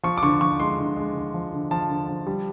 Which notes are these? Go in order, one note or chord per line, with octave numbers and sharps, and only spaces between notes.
F3 C#6
D6
D3 C#6
F3 C#6
G#3 C6
D3
G#3
D3
F3
D3
F3 A5
D3
F3
G3